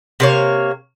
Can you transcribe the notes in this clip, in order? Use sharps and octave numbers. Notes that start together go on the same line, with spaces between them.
C3 A#3 C#5